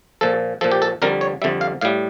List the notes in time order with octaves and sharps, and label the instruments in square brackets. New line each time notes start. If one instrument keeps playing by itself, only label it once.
[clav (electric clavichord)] A#2 F3 A4
A#2 F3 A4
G4
A4
F2 D3 G3 A#4
C#5
F2 D3 G3 E5
F5
A2 G3 F5